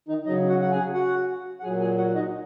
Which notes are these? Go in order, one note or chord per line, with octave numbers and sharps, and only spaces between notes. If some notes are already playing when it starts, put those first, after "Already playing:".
D#3 D#4
C#3 F#3 D#4 D#5
F#4 F#5
F#5
G#4 G#5
F#4 F#5
F#5
A#2 F#3 G#4 G#5
G#4 G#5
F#4 F#5
D#4 D#5